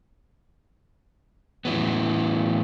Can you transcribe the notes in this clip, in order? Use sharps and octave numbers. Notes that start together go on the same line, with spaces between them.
A2 E3 F#3 B3